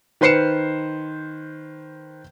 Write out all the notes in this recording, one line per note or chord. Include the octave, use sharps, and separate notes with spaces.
D#3 B4 C5 C7 C#7 E7